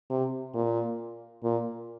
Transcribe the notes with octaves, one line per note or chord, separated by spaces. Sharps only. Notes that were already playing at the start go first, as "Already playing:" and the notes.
C3
A#2
A#2